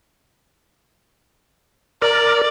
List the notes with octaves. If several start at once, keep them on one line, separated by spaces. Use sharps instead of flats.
A#4 D5